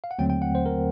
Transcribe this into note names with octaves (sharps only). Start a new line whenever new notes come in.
F5
F#5
D#2 D3 F#3 A3 C4 G5
G5
F#5
C5
A#4